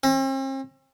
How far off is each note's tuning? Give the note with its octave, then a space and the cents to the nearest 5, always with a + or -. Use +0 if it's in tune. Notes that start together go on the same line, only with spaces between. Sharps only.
C4 +45